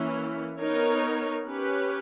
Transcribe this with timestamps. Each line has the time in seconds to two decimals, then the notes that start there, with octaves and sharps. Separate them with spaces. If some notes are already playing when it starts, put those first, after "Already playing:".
Already playing: E3 A#3 C#4 E4
0.58 B3 D#4 A#4 C#5
1.46 C#4 G4 B4